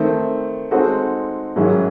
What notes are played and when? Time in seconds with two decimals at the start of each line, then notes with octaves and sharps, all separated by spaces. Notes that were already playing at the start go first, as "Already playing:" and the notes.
Already playing: D#3 A3 C4
0.71 G#3 C4 D#4 F#4 A4
1.56 G#2 D#3 F#3 C#4 E4